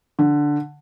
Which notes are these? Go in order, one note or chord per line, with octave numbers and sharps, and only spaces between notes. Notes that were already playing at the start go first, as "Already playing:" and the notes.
D3